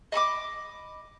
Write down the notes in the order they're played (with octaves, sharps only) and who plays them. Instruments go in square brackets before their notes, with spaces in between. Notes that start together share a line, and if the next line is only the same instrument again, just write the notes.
[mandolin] D#5 B5 C#6 D6